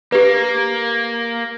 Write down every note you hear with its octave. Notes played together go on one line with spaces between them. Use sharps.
A#3 G4 B4